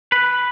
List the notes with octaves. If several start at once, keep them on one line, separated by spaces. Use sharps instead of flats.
B4